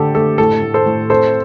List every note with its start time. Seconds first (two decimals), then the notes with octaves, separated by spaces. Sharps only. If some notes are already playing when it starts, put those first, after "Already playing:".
Already playing: D3 A3 G4 A4
0.14 A3 A4
0.38 A2 A4
0.62 A2
0.74 A4 C5
0.86 A2
1.10 C4 A4 C5